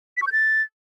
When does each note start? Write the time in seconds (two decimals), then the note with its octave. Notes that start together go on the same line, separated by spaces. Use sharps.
0.17 B6
0.22 C#6
0.27 G6
0.32 A6